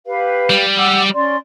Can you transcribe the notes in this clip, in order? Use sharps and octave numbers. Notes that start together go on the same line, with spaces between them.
G4 B4 F5
G3
F#5 D6 E6
C#4 D5 C6